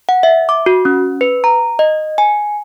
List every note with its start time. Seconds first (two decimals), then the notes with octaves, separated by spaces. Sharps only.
0.09 F#5
0.23 E5
0.49 D6
0.66 F#4
0.85 C#4
1.21 B4
1.44 A#5
1.79 D#5
2.18 G#5